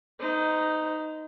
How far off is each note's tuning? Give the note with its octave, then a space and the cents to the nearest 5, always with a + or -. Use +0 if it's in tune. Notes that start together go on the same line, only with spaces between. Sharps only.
D#4 +0 C5 -40